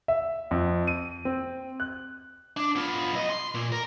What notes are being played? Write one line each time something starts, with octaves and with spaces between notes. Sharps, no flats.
E5
F2
D#7
C4
F#6
D4
B3 F4
B1 D#5
C6
A#2
A#4